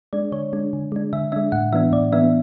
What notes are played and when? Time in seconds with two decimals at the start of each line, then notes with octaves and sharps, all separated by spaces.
0.13 G#3 D4 D5
0.32 D3 C#5
0.53 G#3 D4
0.73 D3
0.92 G#3 D4
1.13 D3 E5
1.32 G#3 D4 E5
1.52 A2 F#5
1.73 E3 B3 D4 E5
1.92 A2 D5
2.12 E3 B3 D4 E5